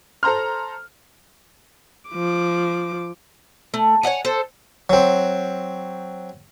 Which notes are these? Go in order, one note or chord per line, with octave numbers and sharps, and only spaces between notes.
A4 C5 A#5 C6 F6
F3 D6
A3
C#5 D#5 F#5 G#5
A4 C5
F#3 C4